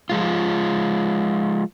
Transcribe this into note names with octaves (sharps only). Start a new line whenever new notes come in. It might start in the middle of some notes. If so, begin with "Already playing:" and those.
F3 G#3 F4